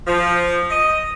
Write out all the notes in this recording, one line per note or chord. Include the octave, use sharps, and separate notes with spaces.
F3
D#5